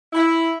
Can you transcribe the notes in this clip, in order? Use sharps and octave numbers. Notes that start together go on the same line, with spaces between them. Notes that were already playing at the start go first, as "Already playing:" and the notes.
E4